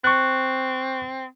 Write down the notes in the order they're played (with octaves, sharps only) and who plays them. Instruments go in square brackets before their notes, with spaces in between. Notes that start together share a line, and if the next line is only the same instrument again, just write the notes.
[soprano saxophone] C4 [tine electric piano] C#6 F#6